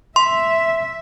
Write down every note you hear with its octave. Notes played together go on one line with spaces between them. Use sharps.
E5 C6